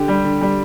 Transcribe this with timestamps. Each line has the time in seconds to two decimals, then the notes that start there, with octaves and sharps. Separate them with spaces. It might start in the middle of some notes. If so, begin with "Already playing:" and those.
Already playing: D3 G4
0.08 G3
0.24 D3
0.41 G3